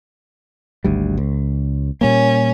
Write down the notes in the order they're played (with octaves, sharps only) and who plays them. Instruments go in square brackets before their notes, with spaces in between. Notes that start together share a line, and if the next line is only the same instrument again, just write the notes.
[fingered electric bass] G#1 D2 G3
C#2
[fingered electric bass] A#2 G3 A#3 [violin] C#4